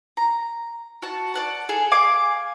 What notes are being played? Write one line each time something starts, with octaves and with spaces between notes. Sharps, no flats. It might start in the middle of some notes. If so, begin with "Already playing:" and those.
A#5
F#4 A5
D5 F#5 A5
G#4 A4
F5 G#5 D6